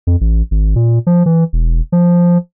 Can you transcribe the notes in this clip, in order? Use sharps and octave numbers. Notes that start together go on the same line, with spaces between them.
F2
A1
G#1
A#2
F3
E3
E1
F3